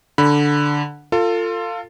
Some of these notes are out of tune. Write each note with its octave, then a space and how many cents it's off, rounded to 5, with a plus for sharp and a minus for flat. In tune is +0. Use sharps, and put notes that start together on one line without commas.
D3 +0 B5 +0
F4 +0 A4 +30